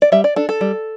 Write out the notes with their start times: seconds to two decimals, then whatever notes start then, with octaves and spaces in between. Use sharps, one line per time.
0.02 D5
0.12 G3 E5
0.24 D5
0.36 D4 A4
0.49 A4
0.61 G3